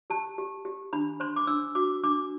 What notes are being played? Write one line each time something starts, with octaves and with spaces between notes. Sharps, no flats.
G4 A5
G4
G4
D4 B5
C5 C6
D6
D4 E6
F#4 D6
D4 D6